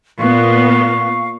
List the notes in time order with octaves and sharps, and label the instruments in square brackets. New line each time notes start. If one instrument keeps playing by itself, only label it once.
[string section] A#2 B3 [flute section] F5 C#6